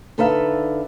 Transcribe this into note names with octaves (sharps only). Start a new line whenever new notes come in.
D3 D#4 A4 B4 E5 F5